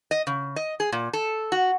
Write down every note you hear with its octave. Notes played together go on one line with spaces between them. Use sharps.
D#5
C#3
D#5
G#4
A#2
A4
F#4